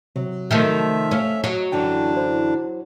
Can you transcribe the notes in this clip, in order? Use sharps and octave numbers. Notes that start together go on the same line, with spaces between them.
C3 F#3
D#3 F3 A3 E5
A3 C#4 C#5 F5
F#3 D#5
F#2 D3 E3 D4 G5
E4 C5